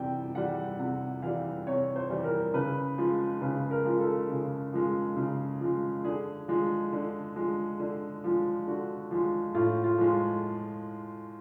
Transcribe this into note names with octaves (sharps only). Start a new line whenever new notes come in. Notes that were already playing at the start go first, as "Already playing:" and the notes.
Already playing: C3 E3 G3 G5
E3 G3 F#5
C3 F#5
E3 G3 F5
C3 C#5
C5
E3 G3
A#4
C#3 B4
F3 G#3
C#3 B4
A#4
F3 G#3
A4
C#3
F3 G#3
C#3
F3 G#3
D3 G#4
F3 G#3
D3
F3 G#3
D3
F3 G#3
D3 F#4
F3 G#3
A2 F4
F4
F3 G#3